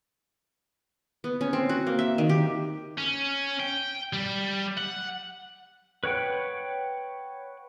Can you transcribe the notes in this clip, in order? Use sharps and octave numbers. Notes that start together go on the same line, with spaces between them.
B3
C#4
C4
F#4
A#3
E5
D#3
G4
C#4
G5
G3
F#5
B4 C#5 F#5 G5